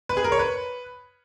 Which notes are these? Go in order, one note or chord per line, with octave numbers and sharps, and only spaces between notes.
B4
G#4
A#4
C#5
B4